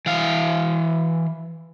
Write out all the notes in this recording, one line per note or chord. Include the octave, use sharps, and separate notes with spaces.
E3 F5